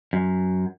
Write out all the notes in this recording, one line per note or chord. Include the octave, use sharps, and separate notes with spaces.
F#2